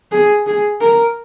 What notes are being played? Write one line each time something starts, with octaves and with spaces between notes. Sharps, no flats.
G#4
G#4
A#4